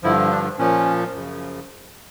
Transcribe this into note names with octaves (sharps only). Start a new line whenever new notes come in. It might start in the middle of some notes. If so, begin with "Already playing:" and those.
G2 D3 F3 E4
D4
A#2 F3 C#4
F#2 C#3 F3